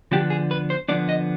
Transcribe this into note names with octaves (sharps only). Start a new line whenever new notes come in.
D3 F3 B3 D4 G4
G#4
B4
C5
D3 F3 B3 D4 D5
D#5